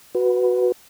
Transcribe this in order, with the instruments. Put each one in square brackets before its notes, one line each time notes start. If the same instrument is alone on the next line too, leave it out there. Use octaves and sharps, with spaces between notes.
[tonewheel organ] F#4 B4